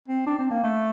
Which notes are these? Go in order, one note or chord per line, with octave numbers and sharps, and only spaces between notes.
C4
D4
C4
A#3
A3